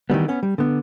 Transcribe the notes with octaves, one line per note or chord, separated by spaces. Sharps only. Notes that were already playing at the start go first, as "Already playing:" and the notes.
D#3 E3 G3 B3
B3 C#4
G3
D3 B3